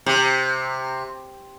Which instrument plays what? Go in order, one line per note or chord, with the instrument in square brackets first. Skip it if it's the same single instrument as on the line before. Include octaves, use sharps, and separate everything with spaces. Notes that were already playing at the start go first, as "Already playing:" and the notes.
[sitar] C3